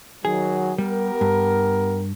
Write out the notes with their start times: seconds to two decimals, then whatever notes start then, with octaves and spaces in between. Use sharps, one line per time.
0.25 D#3 F#3 G#4
0.78 G3 B3 G4 A#4
1.21 G2